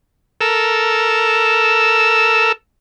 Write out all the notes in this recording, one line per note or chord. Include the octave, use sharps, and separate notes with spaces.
A4 A#4 E6